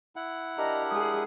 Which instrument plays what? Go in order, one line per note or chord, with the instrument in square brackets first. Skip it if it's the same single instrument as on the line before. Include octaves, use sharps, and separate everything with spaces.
[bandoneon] E4 F#5
[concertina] D4 G4 A#4 [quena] D#5 [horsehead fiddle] A#5
[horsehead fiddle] G#3 G#4 [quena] D#6